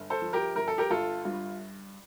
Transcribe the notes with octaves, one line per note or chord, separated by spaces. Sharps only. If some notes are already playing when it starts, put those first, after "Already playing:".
Already playing: G1
A4 C5
F3
G4 A#4
G1 A#4
A4
G4 A#4
G1 F4 A4
G2 F4